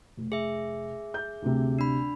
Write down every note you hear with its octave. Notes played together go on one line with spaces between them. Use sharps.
F1
G#4 E5
G6
D2 C3
D4 B5